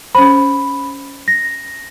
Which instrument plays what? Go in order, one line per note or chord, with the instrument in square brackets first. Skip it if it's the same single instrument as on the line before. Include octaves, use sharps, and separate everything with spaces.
[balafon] C#4 C5 [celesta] B5
[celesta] A#6